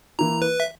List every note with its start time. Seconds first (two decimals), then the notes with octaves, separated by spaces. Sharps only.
0.19 E3 A#3 E4 A#5
0.42 B4
0.60 E5